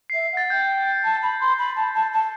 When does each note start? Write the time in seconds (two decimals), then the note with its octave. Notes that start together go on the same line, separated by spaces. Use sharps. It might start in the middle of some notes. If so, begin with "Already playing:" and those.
0.10 C7
0.14 E5
0.24 C7
0.33 F#5 A6
0.50 G5 G6
1.04 A5
1.23 B5
1.41 C6
1.59 B5
1.76 A5
1.95 A5
2.13 A5